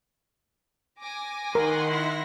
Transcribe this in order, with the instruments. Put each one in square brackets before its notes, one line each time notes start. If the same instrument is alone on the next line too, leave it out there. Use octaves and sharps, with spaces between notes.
[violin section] G#5 D6 A#6
[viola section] D#3 F#5 C6 [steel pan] A#4
[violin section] E4 E5 A#6